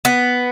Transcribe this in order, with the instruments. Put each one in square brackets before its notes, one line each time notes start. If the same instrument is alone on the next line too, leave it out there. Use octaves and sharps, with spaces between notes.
[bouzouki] B3